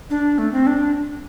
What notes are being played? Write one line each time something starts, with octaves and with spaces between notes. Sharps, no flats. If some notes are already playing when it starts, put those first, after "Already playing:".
D4
A3
C4
D4